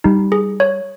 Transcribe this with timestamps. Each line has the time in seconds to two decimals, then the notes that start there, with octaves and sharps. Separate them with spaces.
0.04 G3 D#4
0.32 G#4
0.60 C#5